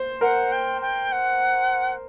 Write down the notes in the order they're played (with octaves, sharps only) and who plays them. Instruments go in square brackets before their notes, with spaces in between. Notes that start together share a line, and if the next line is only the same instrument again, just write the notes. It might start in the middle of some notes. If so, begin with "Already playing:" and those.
Already playing: [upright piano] C5
[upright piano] A#4 [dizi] F#5
[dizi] G5
G5
F#5